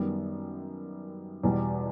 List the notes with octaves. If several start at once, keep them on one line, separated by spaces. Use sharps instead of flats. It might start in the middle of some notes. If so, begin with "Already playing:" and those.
Already playing: F#2 D#3 G3 B3
E2 B2 G3